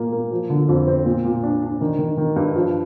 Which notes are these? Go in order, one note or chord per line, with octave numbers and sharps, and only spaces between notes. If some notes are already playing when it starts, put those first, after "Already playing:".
Already playing: A#2 A#3
A#3
F3
D3
F2
C4
A#2
A#2
D4
D4
D#3
D#3
D#3
G2
F3